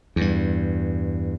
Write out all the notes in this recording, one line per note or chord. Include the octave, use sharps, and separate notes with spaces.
E2 G2